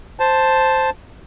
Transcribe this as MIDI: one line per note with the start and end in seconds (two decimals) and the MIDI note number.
0.20 0.90 72
0.20 0.90 81